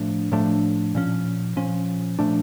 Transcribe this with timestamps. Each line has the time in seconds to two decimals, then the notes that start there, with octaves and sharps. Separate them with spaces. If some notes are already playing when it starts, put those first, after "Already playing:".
Already playing: A2 F3 A3 D4
0.32 A2 F3 A3 D4
0.95 A#2 F3 C#4
1.56 A#2 F3 C#4
2.19 A#2 F3 A3 D4